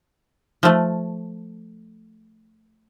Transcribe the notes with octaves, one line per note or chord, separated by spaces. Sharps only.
F3 A3